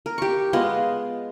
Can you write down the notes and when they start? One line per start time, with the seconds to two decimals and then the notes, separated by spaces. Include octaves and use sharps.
0.06 A#4
0.18 G4 C#6
0.53 G#3 B3 F4 D#5